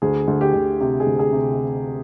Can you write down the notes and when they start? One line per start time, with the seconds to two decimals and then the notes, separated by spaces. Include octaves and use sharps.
0.02 D2 G#4
0.27 D2
0.41 G4
0.54 D2
0.80 C3 G4
1.00 G#4
1.06 D2
1.19 G#4
1.32 C3